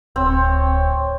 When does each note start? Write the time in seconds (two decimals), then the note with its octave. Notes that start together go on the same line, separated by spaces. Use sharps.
0.16 D1 C4 C#5